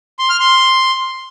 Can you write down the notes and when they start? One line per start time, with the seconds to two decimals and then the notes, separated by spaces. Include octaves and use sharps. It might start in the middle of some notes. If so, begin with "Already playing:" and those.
0.19 C6
0.29 F6
0.40 C6